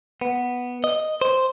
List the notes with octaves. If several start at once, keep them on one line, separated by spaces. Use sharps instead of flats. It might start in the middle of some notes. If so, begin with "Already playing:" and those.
B3
D#5
C5